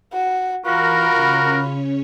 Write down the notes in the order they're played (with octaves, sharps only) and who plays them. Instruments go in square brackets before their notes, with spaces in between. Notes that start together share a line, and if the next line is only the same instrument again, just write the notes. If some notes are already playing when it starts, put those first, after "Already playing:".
[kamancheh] F#4
[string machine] E3 [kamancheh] F4 B5 [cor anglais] F#4 [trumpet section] A#4
[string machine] C#3 C#4 C#5